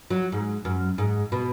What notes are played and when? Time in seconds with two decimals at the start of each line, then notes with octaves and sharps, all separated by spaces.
0.10 F#3
0.32 G#2
0.65 F#2
0.98 G#2
1.32 B2